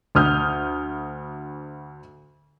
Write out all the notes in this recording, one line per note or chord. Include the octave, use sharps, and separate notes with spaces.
D2 D#6 F6 G6